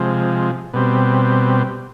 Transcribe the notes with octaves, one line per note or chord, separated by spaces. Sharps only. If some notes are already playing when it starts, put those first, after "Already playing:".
Already playing: C3 F3 G#3
B2 G3 C4